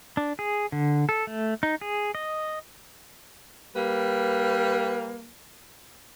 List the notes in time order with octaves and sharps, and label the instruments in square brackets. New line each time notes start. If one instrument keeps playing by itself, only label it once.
[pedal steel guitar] D4
G#4
D3
A4
A3
D#4
G#4
D#5
[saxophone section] G3 A#3 B4